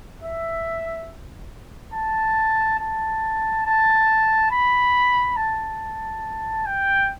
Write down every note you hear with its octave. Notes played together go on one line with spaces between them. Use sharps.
E5
A5
A5
A5
B5
A5
G5